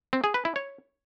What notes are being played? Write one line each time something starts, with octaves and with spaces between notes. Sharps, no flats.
C4
G#4
B4
E4
C#5